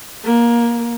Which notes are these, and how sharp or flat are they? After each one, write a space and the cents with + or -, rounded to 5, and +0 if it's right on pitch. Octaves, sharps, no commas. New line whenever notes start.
A#3 +15